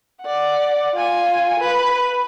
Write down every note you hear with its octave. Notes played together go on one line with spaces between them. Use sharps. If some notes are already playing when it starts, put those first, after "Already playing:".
D5 F#5
F4 G#5
B4